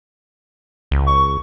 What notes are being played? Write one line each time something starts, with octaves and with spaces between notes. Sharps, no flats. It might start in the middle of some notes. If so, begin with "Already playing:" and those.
C#2
C#6